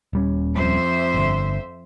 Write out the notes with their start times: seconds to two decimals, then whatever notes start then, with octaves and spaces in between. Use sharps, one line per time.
0.13 D#1 G3 C#4
0.55 F2 C5 E5
1.14 G1 D3